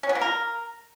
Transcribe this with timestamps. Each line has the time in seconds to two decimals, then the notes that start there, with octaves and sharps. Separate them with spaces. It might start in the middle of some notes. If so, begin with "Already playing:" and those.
0.03 C#4
0.09 B3
0.15 A#3
0.21 A#4